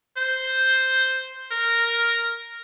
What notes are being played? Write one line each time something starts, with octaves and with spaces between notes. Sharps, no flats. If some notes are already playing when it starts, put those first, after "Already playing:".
C5
A#4